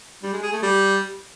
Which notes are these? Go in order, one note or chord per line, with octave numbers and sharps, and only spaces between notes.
G3
G#3
G#4
A3
G3